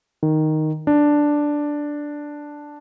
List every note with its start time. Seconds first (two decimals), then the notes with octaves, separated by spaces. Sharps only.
0.23 D#3
0.87 D4